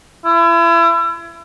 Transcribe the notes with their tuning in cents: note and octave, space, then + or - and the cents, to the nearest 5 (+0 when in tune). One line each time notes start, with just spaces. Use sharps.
E4 +35